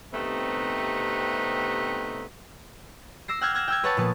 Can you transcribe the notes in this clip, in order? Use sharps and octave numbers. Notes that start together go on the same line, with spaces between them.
G2 C3 A3 B3 C4 D#4
D6 E6 A#6 C7
F#5 G5 E6 F6 G6 G#6
F6 F#6 G#6 A#6 E7
G5 E6 G#6
B4 C#5 F#5 A5 A6
A#2 F3 B3 A5 D#6